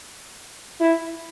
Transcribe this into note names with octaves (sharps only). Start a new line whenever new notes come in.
E4